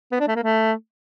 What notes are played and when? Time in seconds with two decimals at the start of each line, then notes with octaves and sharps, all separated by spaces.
0.12 B3
0.20 D4
0.28 A3
0.35 A#3
0.43 A3